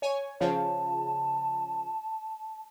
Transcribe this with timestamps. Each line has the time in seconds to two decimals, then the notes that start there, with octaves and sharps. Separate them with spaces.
0.02 C#5 G#5
0.40 C#3 F3 A5